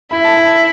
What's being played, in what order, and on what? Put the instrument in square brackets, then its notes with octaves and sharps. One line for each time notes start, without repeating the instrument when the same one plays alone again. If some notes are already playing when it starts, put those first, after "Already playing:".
[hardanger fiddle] E4 [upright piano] B5
[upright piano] A5
B5